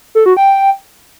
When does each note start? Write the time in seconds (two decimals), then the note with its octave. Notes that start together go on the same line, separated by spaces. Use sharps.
0.15 A4
0.26 F#4
0.37 G5